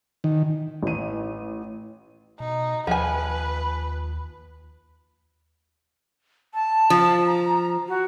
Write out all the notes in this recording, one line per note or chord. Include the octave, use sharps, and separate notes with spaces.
D#3
A1 D#7
B2 D#4
D#2 F3 B4 G#5
A5
F3
A#5
F#4